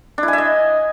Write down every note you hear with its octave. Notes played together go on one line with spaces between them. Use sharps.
D4
E4
G#5
E5
D#5